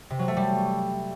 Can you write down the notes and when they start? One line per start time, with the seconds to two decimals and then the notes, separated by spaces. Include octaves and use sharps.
0.10 C3
0.19 F#3
0.28 A3
0.37 G3